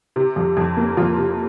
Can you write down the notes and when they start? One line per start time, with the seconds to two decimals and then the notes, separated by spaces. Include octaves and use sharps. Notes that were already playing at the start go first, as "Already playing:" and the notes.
0.16 C3
0.36 F2
0.57 F2
0.77 A#3
0.97 F2 F4
1.17 C3